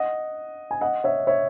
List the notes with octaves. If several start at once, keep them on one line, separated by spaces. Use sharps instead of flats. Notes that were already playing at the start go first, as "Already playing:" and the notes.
Already playing: D#5 F#5
G#5
D#5 F#5
C#5 E5
C#5 E5